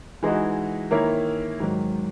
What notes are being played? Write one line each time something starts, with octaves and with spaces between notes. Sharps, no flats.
E3 G#3 D#4 F#4
D#3 A#3 E4 A#4 C#5
G#2 D#3 F#3